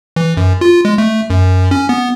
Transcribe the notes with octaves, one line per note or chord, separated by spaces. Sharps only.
E3
F#2
F4
G#3
A3
F#2
C#4
B3